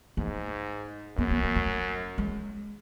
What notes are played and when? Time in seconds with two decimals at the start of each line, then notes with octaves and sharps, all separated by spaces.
0.17 G#2 A3
1.17 F#2 B3
1.30 B3
1.44 A3
1.56 A3
2.18 G#3